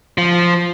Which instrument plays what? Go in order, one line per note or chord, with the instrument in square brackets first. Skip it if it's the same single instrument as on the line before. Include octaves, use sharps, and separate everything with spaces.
[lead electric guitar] F3